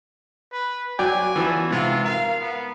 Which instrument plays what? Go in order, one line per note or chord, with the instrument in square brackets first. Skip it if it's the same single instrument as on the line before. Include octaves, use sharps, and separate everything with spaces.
[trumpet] B4
[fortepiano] F#3 D5 G5 [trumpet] G#5
[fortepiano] E3 F3 B3
[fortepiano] G#2 C3 [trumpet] F4
[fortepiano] A#4 [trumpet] F5
[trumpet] B3